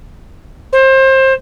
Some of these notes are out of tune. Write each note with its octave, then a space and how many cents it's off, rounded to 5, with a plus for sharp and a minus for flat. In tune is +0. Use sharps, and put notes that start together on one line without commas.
C5 +25